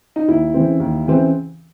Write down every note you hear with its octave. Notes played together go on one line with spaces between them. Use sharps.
D#4
D#2 E4
C#3 E3 C4
D#2
C#3 E3 C4